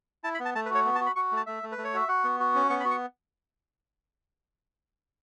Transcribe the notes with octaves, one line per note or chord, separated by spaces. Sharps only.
E4 A5
B5
B3
A5
A3 A5
B4
F#4 C#5
B3
A5
F#4
B5
F#4 C#6
A3
A5
A3 E5
A3
B4
A3
C#5
F#4 E5
F#4 F#5
B3
F#4
C#4
B3 C#6
B5
F#4
C#6